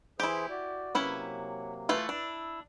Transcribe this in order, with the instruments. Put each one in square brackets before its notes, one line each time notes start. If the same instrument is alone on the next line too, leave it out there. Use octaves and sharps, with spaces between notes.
[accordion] E3 G#4 C5 [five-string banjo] E4 G4
[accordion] F#4 D5
[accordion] C3 F#3 A#3 [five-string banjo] C#4 E4 B4
[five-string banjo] E3 A3 F4
[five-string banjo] D4 [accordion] E4 E6